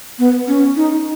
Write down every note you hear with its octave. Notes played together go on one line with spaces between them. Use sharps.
B3
C#4
D#4